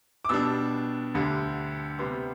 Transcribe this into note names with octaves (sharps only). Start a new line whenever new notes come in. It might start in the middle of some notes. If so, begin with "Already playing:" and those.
D6
B2 G3 D4 E6
D2 D3 G3
C3 G3 B3 C6